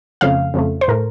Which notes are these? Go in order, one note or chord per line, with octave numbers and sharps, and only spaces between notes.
F2 C#3 F3 A3 F5
F2 C#3 F3 A3
C5
A2 A3 A#4